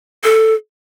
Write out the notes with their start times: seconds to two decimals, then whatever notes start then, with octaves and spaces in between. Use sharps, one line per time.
0.24 A4